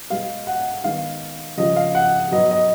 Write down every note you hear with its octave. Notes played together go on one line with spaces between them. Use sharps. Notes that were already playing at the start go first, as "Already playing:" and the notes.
B2 G#3 B3 F5
F#5
D#3 G#3 B3 F5
C#3 F3 G#3 D#5
F5
F#5
B2 F#3 B3 D#5
D#5